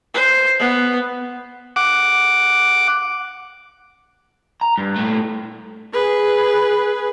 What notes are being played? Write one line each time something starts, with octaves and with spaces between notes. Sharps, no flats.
C5
B3
F#5 D6
A#5
G2
A#2 A3
G#4 B4